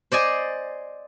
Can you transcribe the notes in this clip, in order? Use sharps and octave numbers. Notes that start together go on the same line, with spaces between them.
C5 D5 D#5 G#5